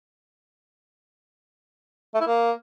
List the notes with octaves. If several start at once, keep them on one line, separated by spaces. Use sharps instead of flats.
A3
E4
A#3